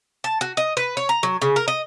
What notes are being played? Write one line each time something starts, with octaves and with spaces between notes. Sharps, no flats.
A5
F#4
D#5
B4
C#5
A#5
F#3
C#3
A#4
D#5